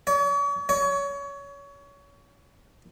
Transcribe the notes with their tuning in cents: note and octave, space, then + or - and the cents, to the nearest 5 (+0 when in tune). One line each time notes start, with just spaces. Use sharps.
C#5 +40
C#5 +25